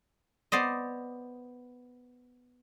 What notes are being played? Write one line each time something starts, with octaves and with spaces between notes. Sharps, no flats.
B3 C5 D5 D#5